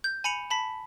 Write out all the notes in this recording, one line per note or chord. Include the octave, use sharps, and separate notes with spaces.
G6
G#5 B5 C#7 F7
A5 B5 B6